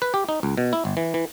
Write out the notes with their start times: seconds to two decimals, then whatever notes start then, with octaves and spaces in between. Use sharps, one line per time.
0.02 B4
0.14 G4
0.29 D#4
0.43 C#2
0.58 B2
0.73 E4
0.85 G1
0.97 E3
1.14 E3